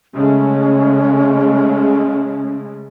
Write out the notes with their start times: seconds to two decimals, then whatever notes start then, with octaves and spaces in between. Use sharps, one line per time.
0.14 C#3 G#3 A3 C#4